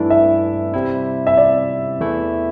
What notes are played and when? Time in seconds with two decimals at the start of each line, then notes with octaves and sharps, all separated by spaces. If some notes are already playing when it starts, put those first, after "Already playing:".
Already playing: G2 E3 A3 D4 E4
0.10 E5
0.74 C3 G3 C4 E4
1.27 E5
1.37 D5
2.00 E2 E3 A3 E4